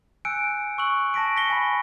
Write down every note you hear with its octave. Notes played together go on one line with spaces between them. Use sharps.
G#5 E6 F#6 G6 C#7 D7
C#6 E6 F#6 F#7
A5 A#6 B6 D7
A#6 B6 C#7 G7
G#5 B5